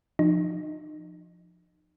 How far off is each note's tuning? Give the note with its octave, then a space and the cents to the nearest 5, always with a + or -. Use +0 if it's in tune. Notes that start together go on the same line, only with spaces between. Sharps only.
F3 +0 D#4 -30